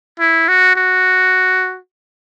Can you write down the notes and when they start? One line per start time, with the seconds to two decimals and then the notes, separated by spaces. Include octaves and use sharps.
0.20 E4
0.48 F#4
0.76 F#4